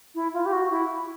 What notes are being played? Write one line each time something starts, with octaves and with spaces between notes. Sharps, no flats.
E4
F4
G4
F#4
E4